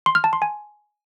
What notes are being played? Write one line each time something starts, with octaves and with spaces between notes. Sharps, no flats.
C6
F6
A5
C6
G#5